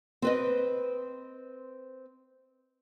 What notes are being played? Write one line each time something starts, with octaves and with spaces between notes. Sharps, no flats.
C4 B4 D#5